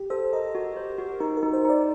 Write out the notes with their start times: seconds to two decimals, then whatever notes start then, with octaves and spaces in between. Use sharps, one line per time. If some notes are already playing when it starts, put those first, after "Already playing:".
Already playing: G4
0.10 A4 C5
0.33 A#4 D#5
0.55 F#4
0.77 C5
0.98 F#4
1.20 D#4 A#4
1.37 A#4
1.43 D#4
1.53 C5
1.65 D#4 D5